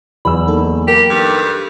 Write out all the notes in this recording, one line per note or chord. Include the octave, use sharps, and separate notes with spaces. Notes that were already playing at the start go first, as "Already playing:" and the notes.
E2 F#3 B4 B5 E6
A#3 D#4 A4
G4 A#4
G2